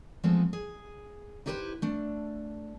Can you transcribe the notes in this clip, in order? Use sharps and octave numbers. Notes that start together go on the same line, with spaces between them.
F3 G#3 A3 B3 C4
G#4
D#4 E4 G4 G#4 B4 C5
A3 D4